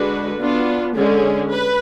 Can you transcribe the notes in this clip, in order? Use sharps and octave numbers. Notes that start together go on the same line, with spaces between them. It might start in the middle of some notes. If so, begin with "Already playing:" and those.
Already playing: D3 G#3 D4 F#4 B4
B3 D4 F4
D3 G#3 C#4 G#4
B4